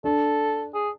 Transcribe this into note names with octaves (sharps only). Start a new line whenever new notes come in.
D4 A4
G#4